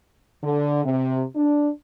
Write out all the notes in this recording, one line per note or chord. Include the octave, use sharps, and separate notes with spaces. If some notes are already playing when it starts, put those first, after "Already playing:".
D3
C3
D4